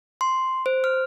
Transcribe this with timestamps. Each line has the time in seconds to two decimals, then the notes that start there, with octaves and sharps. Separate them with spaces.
0.21 C6
0.66 C5
0.84 F6